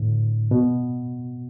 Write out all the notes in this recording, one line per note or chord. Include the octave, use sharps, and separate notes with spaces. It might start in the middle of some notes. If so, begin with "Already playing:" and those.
Already playing: A2 D3
B2